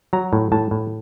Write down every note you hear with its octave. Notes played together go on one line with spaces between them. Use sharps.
F#3 A#5
A2
A2 A5
A2